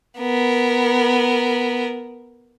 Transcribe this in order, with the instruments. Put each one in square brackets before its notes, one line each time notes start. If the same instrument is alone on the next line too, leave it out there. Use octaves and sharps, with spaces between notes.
[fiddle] B3 A#4